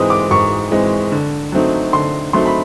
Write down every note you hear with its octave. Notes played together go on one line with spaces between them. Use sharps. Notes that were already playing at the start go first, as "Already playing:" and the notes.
Already playing: G#2 E3 G#3 C4 D#6
D6
G#2 C#6
E3 G#3 C4
D3
F#3 A3 C4 D#4
D3 C6
F#3 A3 C4 D#4 C6
B5